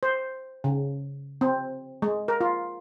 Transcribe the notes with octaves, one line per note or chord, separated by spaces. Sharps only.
C5
C#3
C4
G#3
A#4
F4